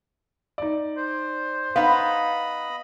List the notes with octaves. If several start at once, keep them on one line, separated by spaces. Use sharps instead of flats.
D#4 D5
C5
B3 D#4 D#5 F5 B5